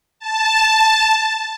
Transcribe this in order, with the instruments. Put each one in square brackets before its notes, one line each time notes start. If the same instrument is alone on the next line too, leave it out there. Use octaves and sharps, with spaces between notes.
[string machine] A5